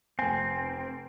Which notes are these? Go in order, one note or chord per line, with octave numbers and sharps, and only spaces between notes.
F1 C4 G#5